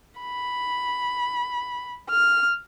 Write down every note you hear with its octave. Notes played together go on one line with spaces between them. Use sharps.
B5
F6